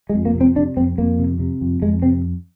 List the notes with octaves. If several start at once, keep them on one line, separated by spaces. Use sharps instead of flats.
G#3
F2
A#3
C3
C4
C3 D4
F2 C4
F2 A#3
C3
C3
F2
F2 G#3
C3 C4